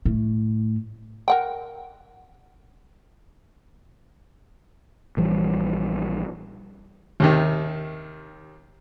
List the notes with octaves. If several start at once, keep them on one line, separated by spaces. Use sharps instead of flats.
A2
A#4 F#5 G5
A#1 E3 G3
D#2 C3 D#3